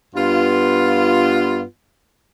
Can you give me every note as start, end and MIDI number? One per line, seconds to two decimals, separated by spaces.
0.15 1.61 43
0.15 1.61 59
0.15 1.61 65